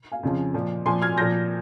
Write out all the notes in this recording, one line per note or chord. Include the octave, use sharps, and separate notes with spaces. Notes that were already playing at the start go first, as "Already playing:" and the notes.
F5 G#5
F2 C#3 F3
A#2 F3
A#2 F3 G#5 C6
F6 G#6
A#2 F3 G6 A#6